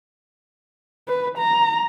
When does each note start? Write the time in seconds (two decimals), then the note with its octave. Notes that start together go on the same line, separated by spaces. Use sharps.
1.08 B4
1.39 A#5